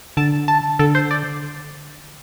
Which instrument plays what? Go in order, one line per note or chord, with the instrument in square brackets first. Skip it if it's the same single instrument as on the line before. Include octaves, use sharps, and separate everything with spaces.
[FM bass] D3 [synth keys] A5
[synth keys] A5
[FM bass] D3 [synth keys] A4
[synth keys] C5
D5